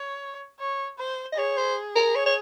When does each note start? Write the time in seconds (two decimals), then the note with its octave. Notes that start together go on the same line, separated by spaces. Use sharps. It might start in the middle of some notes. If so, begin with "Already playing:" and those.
Already playing: C#5
0.60 C#5
0.99 C5
1.32 D#5
1.37 G#4 C#5
1.58 C5
1.96 A#4
2.15 C#5
2.26 C#5